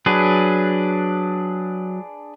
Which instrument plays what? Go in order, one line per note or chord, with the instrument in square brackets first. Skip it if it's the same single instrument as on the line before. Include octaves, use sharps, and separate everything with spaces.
[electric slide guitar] F#3 [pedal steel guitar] D4 G#4 B4